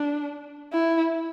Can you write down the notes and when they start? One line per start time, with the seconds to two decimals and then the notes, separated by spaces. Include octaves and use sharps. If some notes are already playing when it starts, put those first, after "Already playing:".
Already playing: D4
0.73 E4